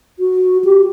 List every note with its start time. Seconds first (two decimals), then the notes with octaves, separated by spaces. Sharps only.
0.19 F#4
0.65 G4